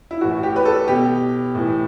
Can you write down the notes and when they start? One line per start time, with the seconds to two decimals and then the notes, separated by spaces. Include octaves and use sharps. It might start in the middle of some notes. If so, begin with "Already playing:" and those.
0.11 E4
0.21 A2 E3 F#4
0.43 G4
0.56 B4
0.65 A4
0.88 B2 G4
1.55 A2 E3